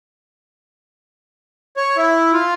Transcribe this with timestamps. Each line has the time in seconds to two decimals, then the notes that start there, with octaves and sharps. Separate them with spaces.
1.77 C#5
1.97 E4
2.33 F4